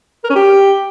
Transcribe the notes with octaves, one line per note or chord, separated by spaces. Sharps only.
A#4
C#4
G4